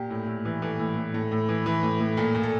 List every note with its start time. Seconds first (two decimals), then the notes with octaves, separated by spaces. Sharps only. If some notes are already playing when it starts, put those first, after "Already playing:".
Already playing: A#2 G4
0.10 A2
0.27 A2
0.45 E3
0.62 E3 A4
0.79 A2
0.96 A2
1.14 A2 A4
1.31 A2
1.49 E3
1.66 E3
1.83 A2
2.00 A2
2.17 A#2 A4
2.35 A#2
2.43 A4